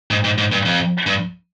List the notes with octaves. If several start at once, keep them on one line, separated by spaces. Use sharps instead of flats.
G#2
G#2
G#2
G2
F2
G2